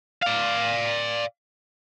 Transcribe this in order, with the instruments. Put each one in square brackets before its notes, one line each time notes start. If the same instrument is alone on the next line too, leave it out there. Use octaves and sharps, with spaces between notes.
[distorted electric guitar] D5 F5